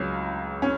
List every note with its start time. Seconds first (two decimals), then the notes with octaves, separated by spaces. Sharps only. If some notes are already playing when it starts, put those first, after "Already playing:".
Already playing: C#2 C#3 F#3 C#4
0.62 C#4